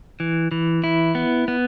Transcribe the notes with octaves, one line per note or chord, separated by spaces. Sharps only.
E3
E3
E4
B3
B3